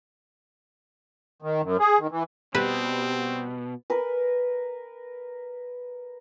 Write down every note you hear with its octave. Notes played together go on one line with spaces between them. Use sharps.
D#3
F#2
G#4
D#3
E3
B2 G3 C4 B4
A#4 B4